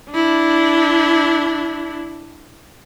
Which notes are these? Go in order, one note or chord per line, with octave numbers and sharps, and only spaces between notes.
D4 E4